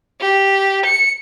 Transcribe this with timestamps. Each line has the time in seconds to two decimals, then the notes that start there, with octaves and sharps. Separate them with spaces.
0.21 G4
0.86 C#7